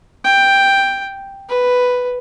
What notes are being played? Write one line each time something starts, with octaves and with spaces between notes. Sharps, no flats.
G5
B4